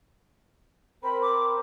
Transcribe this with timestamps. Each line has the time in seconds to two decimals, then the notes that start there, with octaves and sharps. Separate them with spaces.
1.03 C4 A#4 C5 B5
1.22 D6